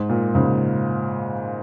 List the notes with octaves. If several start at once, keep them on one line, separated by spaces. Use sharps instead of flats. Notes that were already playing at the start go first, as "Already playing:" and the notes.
Already playing: G#2
A#2
G#2 C#3